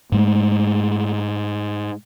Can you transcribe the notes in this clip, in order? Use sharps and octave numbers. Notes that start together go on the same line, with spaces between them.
G#2 G#3 A3